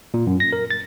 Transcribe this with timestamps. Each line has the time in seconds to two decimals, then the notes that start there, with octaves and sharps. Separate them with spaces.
0.14 A#2
0.27 F#2
0.40 A#6
0.53 A#4
0.71 A6